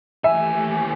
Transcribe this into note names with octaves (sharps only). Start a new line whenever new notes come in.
D#2 E3 A3 G4 E5 G#5